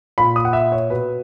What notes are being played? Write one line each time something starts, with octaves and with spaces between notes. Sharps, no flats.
A#2 B5
D#6
F#5
E5
C#5
B2 B4